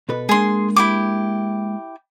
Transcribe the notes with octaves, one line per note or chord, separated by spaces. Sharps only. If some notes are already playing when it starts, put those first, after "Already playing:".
B2 A4 B4
G#3 A#3 D4 G#4 C6
E4 G4 D6